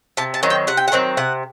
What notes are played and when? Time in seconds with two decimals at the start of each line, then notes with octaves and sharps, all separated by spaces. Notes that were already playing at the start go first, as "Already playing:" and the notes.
0.17 C3 A5
0.34 A5
0.43 D#3 F#3 C4
0.50 G5
0.67 C3 F#5
0.77 G5
0.88 F#5
0.92 D#3 F#3 C4
1.17 C3 F#5